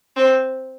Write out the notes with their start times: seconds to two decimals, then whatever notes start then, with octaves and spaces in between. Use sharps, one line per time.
0.16 C4